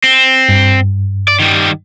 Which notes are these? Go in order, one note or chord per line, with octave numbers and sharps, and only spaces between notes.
C4
G2
D5
D#3 G3